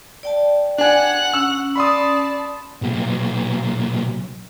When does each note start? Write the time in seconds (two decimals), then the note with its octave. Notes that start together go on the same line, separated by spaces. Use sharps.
0.23 D5 G5 A5
0.78 D4 F#5 G#5 F#6
1.34 C#4 E6
1.76 D5 A5 B5 C6 D#6
2.82 B1 A#2